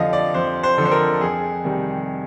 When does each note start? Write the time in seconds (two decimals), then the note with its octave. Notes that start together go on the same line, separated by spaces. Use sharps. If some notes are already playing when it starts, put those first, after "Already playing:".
Already playing: F2 D3 F3 D#5 F5
0.13 D5
0.34 F2 C5
0.63 C5
0.77 D3 F3
0.85 C5
0.91 A#4
1.21 F2 G#4
1.64 C3 D#3 G3